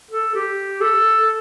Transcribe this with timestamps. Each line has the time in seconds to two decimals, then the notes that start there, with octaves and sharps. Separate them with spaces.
0.11 A4
0.35 G4
0.81 A4